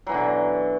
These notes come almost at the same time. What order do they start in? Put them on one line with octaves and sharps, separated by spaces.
F#3 E3 B2 D3